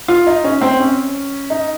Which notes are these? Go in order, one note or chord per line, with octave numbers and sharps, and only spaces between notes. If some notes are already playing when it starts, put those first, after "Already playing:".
F4
D#4
C#4
C4
C#4
D#4